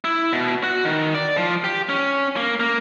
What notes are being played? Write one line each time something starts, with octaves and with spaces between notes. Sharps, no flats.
E4
B2
F#4
D#3
D5
F3
G4
C#4
A#3
A#3